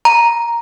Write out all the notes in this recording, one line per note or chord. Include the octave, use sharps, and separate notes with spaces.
A#5